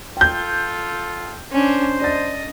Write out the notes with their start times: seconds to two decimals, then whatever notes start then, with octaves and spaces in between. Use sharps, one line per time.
0.17 F4 A4 G5 G6
1.51 C#4 D4 C5
2.01 D4 D#5 A6